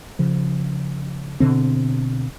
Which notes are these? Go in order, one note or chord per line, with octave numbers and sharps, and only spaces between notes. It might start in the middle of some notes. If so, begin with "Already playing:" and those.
C#3 F3
B2 D3 C4